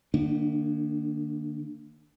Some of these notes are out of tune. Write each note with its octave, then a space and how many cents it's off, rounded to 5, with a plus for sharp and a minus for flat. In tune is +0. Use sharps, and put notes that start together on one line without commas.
D3 +45 A#3 -25 D4 +0